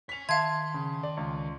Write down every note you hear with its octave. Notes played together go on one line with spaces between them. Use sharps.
C#5 G#5 B6 F7
D#3 E5 F5 A5 C6 G#6
C#3
D5
C#2